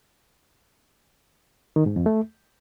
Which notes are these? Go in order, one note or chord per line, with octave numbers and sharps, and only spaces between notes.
D#3
G#2
F2
A3